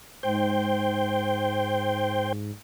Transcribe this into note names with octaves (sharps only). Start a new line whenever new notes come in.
G#2 C5 G5